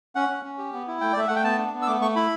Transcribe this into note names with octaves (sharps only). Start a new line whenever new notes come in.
C#4 F#5
C#4
C#4
G4
B3
E4
A3 G5
D5
A3 E5
A3 F#5
G5
B3 A5
D4
B3
E6
A3 D6
A3 C#6
E4 B5